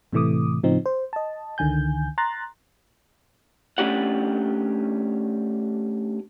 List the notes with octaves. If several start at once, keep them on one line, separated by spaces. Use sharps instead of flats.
A2 C3 E3 A3 D6 D#6
A2 C#3 F3 C4 D#4
C5
D#5 A5
C#2 D3 D#3 G#5 G6
A#5 C6 F#6 A6
A3 C#4 D4 G4 F#5